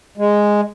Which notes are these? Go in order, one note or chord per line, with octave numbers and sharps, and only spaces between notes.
G#3